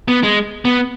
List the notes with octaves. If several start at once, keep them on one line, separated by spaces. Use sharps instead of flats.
B3
G#3
B3